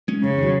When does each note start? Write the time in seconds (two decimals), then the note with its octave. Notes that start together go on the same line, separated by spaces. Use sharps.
0.08 G#3 C#4
0.23 F2 C#3
0.38 D#3 F#3